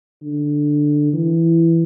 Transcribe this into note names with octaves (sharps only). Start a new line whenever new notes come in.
D3
E3